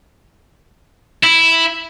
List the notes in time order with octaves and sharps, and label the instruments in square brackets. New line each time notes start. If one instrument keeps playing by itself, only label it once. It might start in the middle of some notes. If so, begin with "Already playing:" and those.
[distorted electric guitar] E4